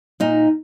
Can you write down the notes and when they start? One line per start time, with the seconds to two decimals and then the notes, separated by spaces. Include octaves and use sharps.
0.20 A#2 D#4